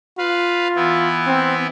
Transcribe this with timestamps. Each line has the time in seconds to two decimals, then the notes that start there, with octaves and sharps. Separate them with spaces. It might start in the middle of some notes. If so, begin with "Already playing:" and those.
0.18 F4 B4 F5
0.76 E3 B3 E4
1.27 C4